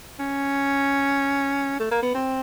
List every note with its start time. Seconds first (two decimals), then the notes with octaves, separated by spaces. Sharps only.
0.19 C#4
1.79 A3
1.91 A#3
2.02 B3
2.15 C4